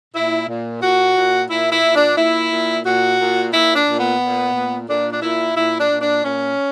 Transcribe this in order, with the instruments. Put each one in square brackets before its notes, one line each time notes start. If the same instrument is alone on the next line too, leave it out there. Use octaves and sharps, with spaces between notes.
[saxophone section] A#2 E4
A#2
A#2 F#4
A#2
A#2 E4
E4
A#2
D4
A#2 E4
A#2
A#2 F#4
A#2
A#2 E4
D4
A#2
B3
A#2
A#2
A#2 D4
D4
A#2 E4
A#2 E4
D4
A#2
D4
A#2 C#4